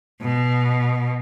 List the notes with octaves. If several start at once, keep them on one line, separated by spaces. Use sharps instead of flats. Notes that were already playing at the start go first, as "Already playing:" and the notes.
B2